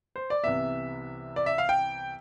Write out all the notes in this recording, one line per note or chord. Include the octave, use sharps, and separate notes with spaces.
C5
D5
C2 C3 E3 B3 E5
D5
E5
F5
G5